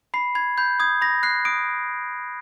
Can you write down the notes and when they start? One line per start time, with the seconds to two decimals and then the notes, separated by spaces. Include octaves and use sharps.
0.14 B5 C7
0.35 B5 G#6
0.58 B5 G6
0.80 D#6 G#6
1.01 B5 A#6
1.23 F#6 C7
1.45 D#6 D7